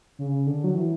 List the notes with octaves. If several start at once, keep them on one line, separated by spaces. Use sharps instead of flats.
C#3
D3
F#3
E3